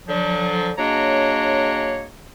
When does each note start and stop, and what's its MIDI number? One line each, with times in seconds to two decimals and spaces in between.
0.07 0.70 50
0.07 0.70 53
0.07 0.70 54
0.78 2.06 54
0.78 2.06 56
0.78 2.06 58
0.78 2.06 62
0.78 2.06 73
0.78 2.06 82